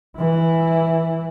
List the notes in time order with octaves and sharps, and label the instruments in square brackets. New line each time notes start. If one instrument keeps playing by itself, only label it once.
[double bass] E3 E4